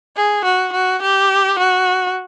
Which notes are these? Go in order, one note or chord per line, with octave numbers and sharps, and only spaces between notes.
G#4
F#4
F#4
G4
F#4